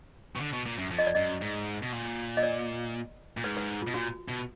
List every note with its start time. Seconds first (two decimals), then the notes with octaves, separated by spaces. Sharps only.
0.36 B2
0.40 D3
0.53 B2
0.66 A#2
0.78 F#2
0.91 F2
0.99 D#5
1.07 D5
1.15 F#2 D#5
1.41 G#2
1.82 B2
1.92 A#2
2.37 D#5
2.43 D5
3.37 A#2
3.44 G#2 B4
3.57 B4
3.82 F4
3.87 B2
3.94 A#2 F#4
4.28 B2